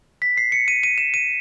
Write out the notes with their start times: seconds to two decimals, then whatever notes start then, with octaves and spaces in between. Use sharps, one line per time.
0.22 B6
0.37 C7
0.52 C#7
0.68 D#7
0.83 D#7
0.98 E7
1.14 D#7